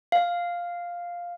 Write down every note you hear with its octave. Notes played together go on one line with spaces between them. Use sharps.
F5